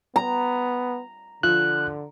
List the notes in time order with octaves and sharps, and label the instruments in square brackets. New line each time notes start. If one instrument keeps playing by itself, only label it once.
[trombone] B3 [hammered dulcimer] A#5
[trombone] D3 [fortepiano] F3 [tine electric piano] F#6